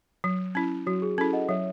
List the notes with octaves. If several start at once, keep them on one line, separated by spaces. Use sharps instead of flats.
F#3
C#4 E4
F#3 F#4
G#4
C#4 E4 A4
D#5 F#5
F#3 C#5 E5